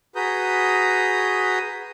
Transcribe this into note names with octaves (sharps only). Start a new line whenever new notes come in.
F#4 G#4 B4 A#5 D#6 G6